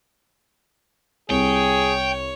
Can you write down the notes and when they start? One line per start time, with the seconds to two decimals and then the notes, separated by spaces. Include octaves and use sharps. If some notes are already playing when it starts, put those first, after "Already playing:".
1.30 C2 G#4 C#5 G5